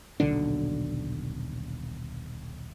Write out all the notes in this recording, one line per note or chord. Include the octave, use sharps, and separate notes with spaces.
D#1 B1 D3 D4